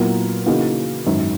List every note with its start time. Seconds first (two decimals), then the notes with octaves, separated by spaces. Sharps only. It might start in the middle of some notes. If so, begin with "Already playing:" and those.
Already playing: A#2 F#3 B3 E4 A#4
0.46 C#3 E3 A#3 D#4 F#4
1.07 G#1 F#2 D#3